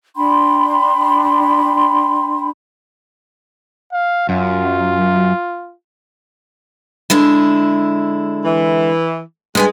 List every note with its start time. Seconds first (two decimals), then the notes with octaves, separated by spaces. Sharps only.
0.16 D4 G5 B5 C6
3.93 F5
4.29 F#2 F4
7.10 D3 G#3 E4
8.44 E3
9.55 G2 G#3 B3 G#5